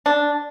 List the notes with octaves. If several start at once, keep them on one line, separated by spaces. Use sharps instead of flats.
D4